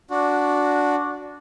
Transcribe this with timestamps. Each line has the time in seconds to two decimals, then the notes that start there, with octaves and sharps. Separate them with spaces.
0.10 D4 F#4